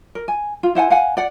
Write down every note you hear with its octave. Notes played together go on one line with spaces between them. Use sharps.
A#4
G#5
F4
E4 C5 F#5 G#5
F5 F#5 G#5
D5 F#5